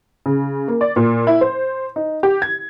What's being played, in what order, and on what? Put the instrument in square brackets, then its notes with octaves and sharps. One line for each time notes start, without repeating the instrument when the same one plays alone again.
[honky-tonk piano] C#3
A#3
D5
A#2
E4
C5
D#4
G4
G#6